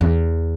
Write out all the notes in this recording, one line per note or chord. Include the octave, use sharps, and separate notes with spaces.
E2